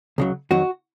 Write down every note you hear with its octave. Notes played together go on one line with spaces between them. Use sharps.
C#2 C#3 F#3
F2 D#3 F#3 F#4